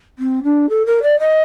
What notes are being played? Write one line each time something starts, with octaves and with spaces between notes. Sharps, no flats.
C4
D4
A4
A#4
D5
D#5